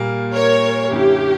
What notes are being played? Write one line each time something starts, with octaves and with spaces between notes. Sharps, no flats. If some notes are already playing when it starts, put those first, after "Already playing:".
Already playing: A#2 G3 A#3
A#4 C#5
F#2 D3 A#3 C#4 E4 G4